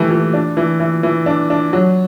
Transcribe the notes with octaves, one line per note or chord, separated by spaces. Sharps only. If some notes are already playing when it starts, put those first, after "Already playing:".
Already playing: E3 A3 G4
E3
D4
E3
E3
E3
D4
D4
F#3